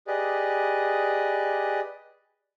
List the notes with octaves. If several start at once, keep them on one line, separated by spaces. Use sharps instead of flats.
G4 G#4 B4 D5 D#5